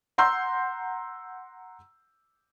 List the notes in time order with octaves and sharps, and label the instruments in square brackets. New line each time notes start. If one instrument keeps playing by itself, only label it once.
[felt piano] F#5 A#5 C6 E6 G6